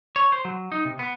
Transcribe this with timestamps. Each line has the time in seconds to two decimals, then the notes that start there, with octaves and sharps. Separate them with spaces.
0.16 C#5
0.32 C5
0.45 F#3
0.72 D#4
0.85 C3
0.99 B3